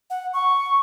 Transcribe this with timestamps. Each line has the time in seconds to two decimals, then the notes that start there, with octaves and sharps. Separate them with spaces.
0.10 F#5
0.34 C#6